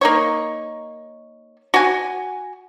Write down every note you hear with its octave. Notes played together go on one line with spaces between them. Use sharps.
A#3 D#4 C#5
F#4 G#5